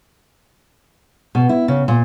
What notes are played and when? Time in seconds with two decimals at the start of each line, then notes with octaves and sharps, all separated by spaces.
1.35 B2
1.49 E4
1.68 C#3
1.88 A#2